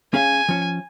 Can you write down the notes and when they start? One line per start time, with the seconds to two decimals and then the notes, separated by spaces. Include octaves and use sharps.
0.14 C#4 G#4 F5 G#5
0.49 F3 C#4